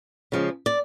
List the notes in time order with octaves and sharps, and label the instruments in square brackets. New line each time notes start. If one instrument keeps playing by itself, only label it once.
[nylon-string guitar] C#3 F3 G#3
D5